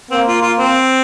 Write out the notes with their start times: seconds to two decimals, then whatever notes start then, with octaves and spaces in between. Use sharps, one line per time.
0.11 A#3 C4
0.27 F4
0.42 F4
0.59 C4